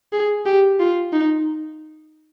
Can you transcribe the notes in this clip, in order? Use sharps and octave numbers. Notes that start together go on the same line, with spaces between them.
G#4
G4
F4
D#4